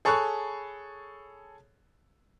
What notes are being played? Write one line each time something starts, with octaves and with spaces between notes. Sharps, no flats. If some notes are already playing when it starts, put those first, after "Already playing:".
G#4 A4 C#5 B5 C#6 F#6